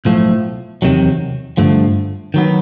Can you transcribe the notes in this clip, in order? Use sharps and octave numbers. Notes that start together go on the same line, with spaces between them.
B1 A2 F3 A3
E2 C3 D#3 F#3
G2 D3 F3 A3
D#3 F#3 B3